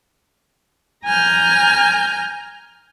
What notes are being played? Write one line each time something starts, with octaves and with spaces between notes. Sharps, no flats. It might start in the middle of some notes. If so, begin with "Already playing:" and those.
G#5 A#5 F6 G6